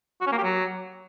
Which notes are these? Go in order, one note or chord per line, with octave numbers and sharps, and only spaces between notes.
F#4
C#4
A#3
G4
F#3